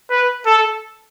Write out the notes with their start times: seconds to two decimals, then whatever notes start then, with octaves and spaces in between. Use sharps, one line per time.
0.10 B4
0.46 A4